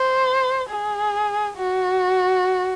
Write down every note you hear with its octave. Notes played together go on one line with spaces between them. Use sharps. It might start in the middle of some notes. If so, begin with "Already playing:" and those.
Already playing: C5
G#4
F#4